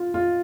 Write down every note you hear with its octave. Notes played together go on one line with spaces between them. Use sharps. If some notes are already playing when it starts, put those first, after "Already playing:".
Already playing: F4
F4